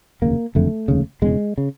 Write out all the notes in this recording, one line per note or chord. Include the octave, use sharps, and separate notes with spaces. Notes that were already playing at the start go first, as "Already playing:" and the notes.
F1 D#2 C#3 A#3
F#1 F2 D3 A3
F1 D#2 C#3
E1 E2 C#3 G#3
C#3